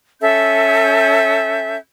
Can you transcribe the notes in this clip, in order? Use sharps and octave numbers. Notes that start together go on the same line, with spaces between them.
C#4 A4 E5 G6